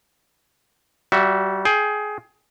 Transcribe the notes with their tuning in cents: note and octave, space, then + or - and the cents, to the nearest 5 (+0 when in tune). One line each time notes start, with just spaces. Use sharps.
G3 -25 F#4 +0 E5 +0
G#4 +20 G5 +10